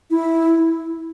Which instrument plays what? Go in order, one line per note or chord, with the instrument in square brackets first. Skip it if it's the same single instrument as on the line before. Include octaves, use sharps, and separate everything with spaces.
[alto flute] E4